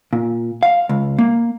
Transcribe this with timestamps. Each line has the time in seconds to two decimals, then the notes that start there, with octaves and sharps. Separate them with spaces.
0.13 A#2
0.63 F5
0.89 C#2
1.19 A#3